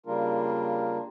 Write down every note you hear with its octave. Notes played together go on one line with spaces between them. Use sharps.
C#3 G3 A#3 D4 F4 A#4